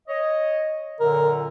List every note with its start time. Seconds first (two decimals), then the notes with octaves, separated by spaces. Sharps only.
0.08 C#5 D#5
1.00 F#2 A#2 D3 A#4